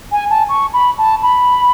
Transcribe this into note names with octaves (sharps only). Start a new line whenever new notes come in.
G#5
A5
C#6
B5
A5
B5